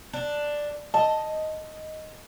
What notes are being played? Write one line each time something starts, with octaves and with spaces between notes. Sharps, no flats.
D4
D#5 A5